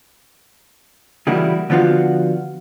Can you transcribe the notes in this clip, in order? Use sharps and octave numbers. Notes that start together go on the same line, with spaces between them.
C#3 E3 G3 A#3 E4 F#4
D3 F3 B3 F4 F#4